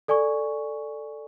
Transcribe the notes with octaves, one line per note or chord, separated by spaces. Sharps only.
A4 D5 G#5 C#6